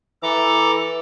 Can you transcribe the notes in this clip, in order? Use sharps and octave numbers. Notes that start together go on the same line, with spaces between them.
E3 A4 A#5 D6